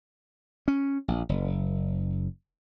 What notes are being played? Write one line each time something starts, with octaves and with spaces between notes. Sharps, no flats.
C#4
A#1
F#1